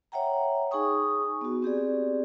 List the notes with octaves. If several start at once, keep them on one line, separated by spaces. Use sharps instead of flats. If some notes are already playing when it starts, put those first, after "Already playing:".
C#5 E5 F#5 G5 A#5
D#4 G#4 G#5 C#6 D#6
B3 F#4
C4 G4 G#4 D5